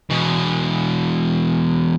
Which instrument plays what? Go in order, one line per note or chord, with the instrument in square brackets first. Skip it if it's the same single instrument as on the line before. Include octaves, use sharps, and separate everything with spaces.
[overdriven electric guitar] E2 B2